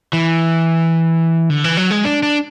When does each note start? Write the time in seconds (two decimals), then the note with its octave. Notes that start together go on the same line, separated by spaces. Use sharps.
0.13 E3
1.50 D3
1.64 E3
1.77 F#3
1.91 G#3
2.05 D4
2.23 D4